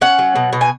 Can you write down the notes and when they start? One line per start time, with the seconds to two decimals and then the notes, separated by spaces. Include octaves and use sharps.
0.01 C#4 F#5
0.19 F#3
0.36 B2
0.53 B2
0.61 G#5